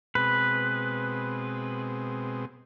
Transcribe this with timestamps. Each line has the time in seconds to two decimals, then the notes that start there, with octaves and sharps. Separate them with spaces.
0.15 B2 G#3 C4 B4